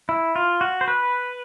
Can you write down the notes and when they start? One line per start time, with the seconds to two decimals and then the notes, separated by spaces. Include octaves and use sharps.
0.09 E4
0.36 F4
0.61 F#4
0.81 C5
0.88 B4